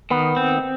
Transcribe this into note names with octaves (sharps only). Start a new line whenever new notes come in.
D#3 B3
C4